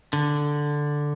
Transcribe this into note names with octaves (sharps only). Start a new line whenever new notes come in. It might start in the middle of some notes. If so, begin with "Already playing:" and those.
D3